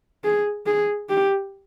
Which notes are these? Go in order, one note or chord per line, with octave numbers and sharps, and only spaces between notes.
G#4
G#4
G4